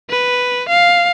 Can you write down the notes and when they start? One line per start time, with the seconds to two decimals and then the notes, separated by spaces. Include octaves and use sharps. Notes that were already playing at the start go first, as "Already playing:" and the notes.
0.11 B4
0.69 F5